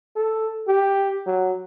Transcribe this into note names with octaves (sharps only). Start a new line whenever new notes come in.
A4
G4
F#3